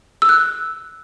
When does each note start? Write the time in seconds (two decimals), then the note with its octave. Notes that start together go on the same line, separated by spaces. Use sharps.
0.22 E6
0.29 F#6